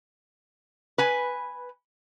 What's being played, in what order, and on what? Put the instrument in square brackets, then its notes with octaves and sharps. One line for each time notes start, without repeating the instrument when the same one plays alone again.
[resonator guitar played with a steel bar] B4 G#5